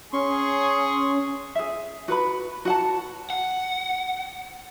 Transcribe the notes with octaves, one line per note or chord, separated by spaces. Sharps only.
C#4 G#4 C6 C#6
G#4 E5
F#4 B4 B5
F#4 F#5 A5
F#5